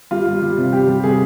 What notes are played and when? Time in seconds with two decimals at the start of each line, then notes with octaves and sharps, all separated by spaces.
0.11 G3 F4
0.27 G3
0.42 G3
0.58 C3
0.73 G3 G4
0.88 G3
1.03 C3 G#4